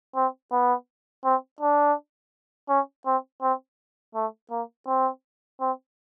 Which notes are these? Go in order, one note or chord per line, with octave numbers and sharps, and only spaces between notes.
C4
B3
C4
D4
C#4
C4
C4
A3
A#3
C4
C4